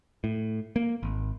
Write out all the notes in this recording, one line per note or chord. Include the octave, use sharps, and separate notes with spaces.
A2
A#3
G#1